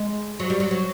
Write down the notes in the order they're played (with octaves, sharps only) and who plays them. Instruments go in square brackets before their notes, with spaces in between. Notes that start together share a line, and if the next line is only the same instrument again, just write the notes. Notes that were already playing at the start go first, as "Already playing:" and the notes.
Already playing: [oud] G#3
F#3
G3
F#3
F#3